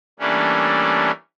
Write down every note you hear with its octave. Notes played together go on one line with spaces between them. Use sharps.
E3 G3 A3 A#3 C#4 D4